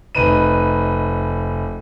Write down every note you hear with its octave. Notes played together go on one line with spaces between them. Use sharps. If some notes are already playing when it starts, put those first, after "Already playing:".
F1 D#4 B4 D#7